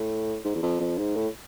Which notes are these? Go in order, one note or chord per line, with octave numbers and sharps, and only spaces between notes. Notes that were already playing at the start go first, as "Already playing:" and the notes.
Already playing: A2
G#2
E2
F2
F2
G#2
A2